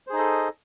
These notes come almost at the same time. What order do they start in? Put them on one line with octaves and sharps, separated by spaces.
C5 G#4 D#4 D#5 A4